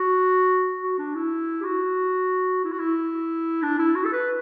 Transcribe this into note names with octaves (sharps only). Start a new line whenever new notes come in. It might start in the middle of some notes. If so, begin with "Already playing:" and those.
Already playing: F#4
F#4
D4
E4
G4
F#4
E4
F#4
E4
D4
E4
F#4
A4
B4